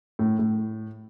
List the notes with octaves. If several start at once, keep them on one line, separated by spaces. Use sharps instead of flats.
A2
A2